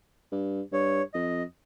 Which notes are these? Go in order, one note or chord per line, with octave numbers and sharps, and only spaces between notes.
G2
G2 C#5
F2 D#5